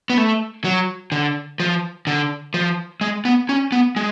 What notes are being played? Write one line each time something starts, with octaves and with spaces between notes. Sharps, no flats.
B3
A3
F#3
D3
F3
D3
F3
G#3
B3
C#4
B3
G#3